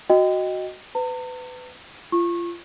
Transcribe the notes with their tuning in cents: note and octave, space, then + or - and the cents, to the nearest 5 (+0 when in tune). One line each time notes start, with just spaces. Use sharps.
F#4 +0 D#5 +0 G5 +0
B4 +25 A#5 -45
F4 -25 C#6 -25